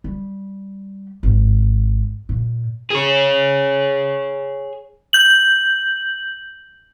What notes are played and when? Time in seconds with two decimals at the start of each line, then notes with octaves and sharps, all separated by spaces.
0.04 G3
1.23 G#1
2.29 A#2
2.91 G#4 C#5
5.13 G6 F#7